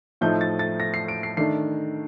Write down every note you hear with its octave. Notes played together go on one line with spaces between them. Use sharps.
A2 F3 A3 D#4 G6
A6
A6
A#6
C7
D7
C7
D#3 A3 D4 C7